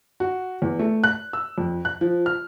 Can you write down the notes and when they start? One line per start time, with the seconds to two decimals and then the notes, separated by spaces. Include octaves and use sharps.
0.20 F#4
0.62 E2
0.79 A3
1.04 F#6
1.33 E6
1.58 F2
1.85 F#6
2.01 F3
2.26 F6